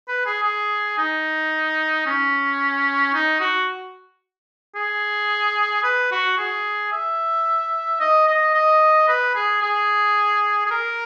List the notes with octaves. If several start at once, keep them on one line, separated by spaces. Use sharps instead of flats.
B4
G#4
G#4
D#4
C#4
D#4
F#4
G#4
B4
F#4
G#4
E5
D#5
D#5
D#5
B4
G#4
G#4
G#4
A#4